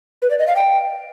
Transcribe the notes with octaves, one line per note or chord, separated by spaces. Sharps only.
B4
D5
D#5
F5
G5